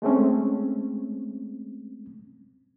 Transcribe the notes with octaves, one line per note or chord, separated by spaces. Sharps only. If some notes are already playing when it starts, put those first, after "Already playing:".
G#3 A3 C4 C#4